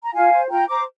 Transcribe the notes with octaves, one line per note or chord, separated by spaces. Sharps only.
A#5
F4 F5 G#5
C5
F4 G5 A#5
C5 A#5 D6